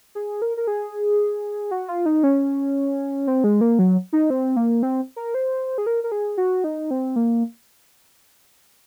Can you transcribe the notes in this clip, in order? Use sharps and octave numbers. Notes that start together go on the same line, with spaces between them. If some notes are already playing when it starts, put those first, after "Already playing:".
G#4
A#4
A#4
G#4
F#4
F4
D#4
C#4
C4
G#3
A#3
F#3
D#4
C4
A#3
C4
A#4
C5
G#4
A#4
A#4
G#4
F#4
D#4
C4
A#3